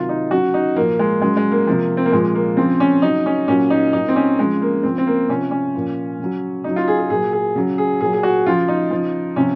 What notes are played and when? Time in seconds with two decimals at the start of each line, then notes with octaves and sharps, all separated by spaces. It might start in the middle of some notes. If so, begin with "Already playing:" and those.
Already playing: C3 D#3 F#3 F4
0.09 D#4
0.31 C#3 F#3 F#4
0.54 D#4
0.76 A#2 F3 A#3
0.99 G#3
1.21 C#3 F#3 G#3
1.37 G#3
1.51 A#3
1.67 C3 F3
1.97 C4
2.05 A#3
2.12 A#2 F3 G#3
2.35 A#3
2.57 C#3 F3 C4
2.80 C#4
3.02 C#3 F#3 D#4
3.26 C#4
3.48 A#2 F#3 C#4
3.70 D#4
3.93 A#2 F#3 D#4
4.09 C4
4.16 C#4
4.38 C#3 F3 G#3
4.62 A#3
4.83 C#3 F3 C4
4.98 C4
5.07 A#3
5.29 C3 F3 C#4
5.51 C#4
5.75 A#2 F3
6.20 C#3 F#3
6.64 C#3 F#3 D#4
6.76 F4
6.88 G#4
6.98 G#4
7.10 A#2 F#3 G#4
7.33 G#4
7.56 C#3 F#3
7.78 G#4
8.00 A#2 F#3 G#4
8.13 G#4
8.23 F#4
8.46 C#3 F3 F4
8.68 D#4
8.91 C#3 F3
9.36 C3 F3 C#4